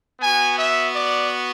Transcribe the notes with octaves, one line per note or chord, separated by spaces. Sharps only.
B3 F#4 G#5
E5
D5